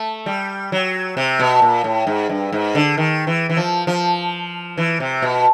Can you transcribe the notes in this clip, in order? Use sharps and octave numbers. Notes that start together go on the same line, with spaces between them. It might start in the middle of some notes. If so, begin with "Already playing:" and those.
Already playing: A3
G3
F#3
C3
B2
A#2
A2
G#2
G2
G#2
D3
D#3
E3
E3
F3
F3
E3
C3
B2